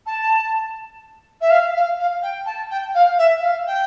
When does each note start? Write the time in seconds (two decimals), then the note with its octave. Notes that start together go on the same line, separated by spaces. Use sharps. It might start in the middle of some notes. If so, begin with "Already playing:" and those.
0.06 A5
1.41 E5
1.50 F5
1.74 F5
1.99 F5
2.22 G5
2.45 A5
2.70 G5
2.95 F5
3.18 E5
3.42 F5
3.67 G5